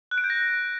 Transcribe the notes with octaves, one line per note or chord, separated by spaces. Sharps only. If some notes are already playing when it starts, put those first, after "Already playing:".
F#6
D7
G6
A#6